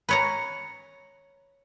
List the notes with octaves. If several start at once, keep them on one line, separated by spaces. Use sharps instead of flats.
B4 C#5 A#5